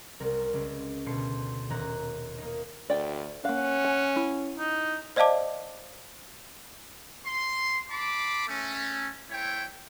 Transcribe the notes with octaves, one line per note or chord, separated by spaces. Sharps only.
C2 A#4
C#2
D2 B2 C6 C#7
D#1 A#5 F#6
A#3 D#4
D2 D5 G5
A#3 C#4 F5 F#5
G#5
E4
D#4
C5 D5 D#5 F5 A5 D6
C6
A5 B5 C6 D6
A3 C#4
A3 E4 C5 C#5 G5